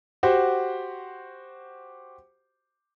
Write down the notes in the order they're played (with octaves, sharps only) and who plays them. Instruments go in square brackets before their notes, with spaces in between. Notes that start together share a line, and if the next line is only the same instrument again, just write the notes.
[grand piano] F#4 G4 C5 F#5